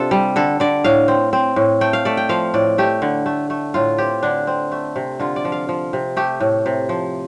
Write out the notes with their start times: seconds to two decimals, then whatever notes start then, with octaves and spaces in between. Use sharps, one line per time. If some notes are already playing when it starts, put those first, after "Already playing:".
Already playing: C3 D4 F4 A4
0.11 G3
0.36 D3 A4
0.60 D3 D5
0.84 A2 F5
1.08 C4
1.33 C4
1.56 A2
1.81 A3 G5
1.93 F5
2.05 A3 D5
2.17 G5
2.29 F3 F5
2.54 A2 D5
2.78 A3 G4
3.02 D3
3.26 A3
3.50 A3
3.74 A2 F4
3.98 C4 G4
4.23 D3 D4
4.47 C4
4.72 A3
4.96 C3
5.20 D3 F4
5.36 D5
5.45 F3
5.52 F5
5.69 F3
5.93 C3
6.17 A3 G4
6.40 A2
6.66 C3
6.89 F3